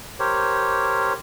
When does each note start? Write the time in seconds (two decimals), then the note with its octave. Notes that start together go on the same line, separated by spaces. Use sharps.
0.20 G4 A#4 C5 C#5